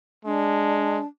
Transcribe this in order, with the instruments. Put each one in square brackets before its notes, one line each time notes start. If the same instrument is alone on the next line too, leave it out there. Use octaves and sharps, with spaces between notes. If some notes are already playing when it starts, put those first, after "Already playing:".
[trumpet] G#3 [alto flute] D4